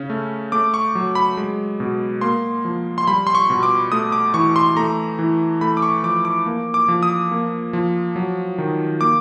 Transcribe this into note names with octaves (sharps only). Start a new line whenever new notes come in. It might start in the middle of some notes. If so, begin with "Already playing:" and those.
Already playing: C#3 C#4
A3
A3 D6
C#6
F#3
B5
G#3
B2
A#3 C6
F3
C6
G3 B5
C6
C#6
B2
D6
A3 D#6
D6
E3 C#6
C6
A3 A#5
E3
A3 B5
D6
C#6
F3 D6
D6
A#3
D6
F3
D#6
A#3
F3
F#3
D#3
A#3 D6